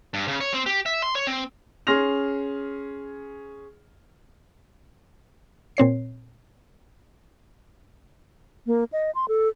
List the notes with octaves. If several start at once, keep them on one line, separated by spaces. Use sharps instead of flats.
G2
C#3
C#5
C4
G4
E5
C6
C#5
C4
C#4 G#4 C6 F6 A#6 F7
A#2 C4 C#5 C7
A#3
D#5
C6
A4